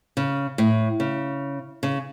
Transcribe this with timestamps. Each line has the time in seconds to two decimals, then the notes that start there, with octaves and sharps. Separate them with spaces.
0.17 C#3
0.58 A2
1.00 C#3
1.83 C#3